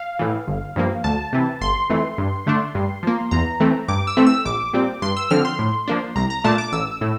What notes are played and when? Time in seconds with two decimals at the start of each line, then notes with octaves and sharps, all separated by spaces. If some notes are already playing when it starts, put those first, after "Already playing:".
Already playing: F5
0.19 A2 E3
0.48 G1
0.76 G2 F3 A#3
1.04 D2 A5
1.33 C3 E3
1.61 G1 C6
1.90 F2 E3 A3
2.18 G2
2.46 D3 A3 D4
2.75 G2
3.03 F3 A#3
3.31 E2 A#5
3.60 E3 A3 C4
3.88 G2 D6
4.07 E6
4.17 E3 A3 C4
4.26 E6
4.45 A#1 D6
4.73 A#2 G3 C4
5.02 G2 C6
5.17 E6
5.30 D3 F3 C4 F6
5.45 C6
5.59 A2
5.88 F3 A#3 D4
6.16 C2 A#5
6.30 A#5
6.44 A#2 A3 D4 A5
6.58 D6
6.73 A1 E6
7.01 A2